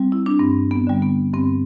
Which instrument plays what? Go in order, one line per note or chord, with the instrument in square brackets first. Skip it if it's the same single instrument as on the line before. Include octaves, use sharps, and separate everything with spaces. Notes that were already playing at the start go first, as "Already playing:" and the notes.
Already playing: [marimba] G3 C4
E4
D4
G2 C4
B3
D3 G3
B3
G2 C4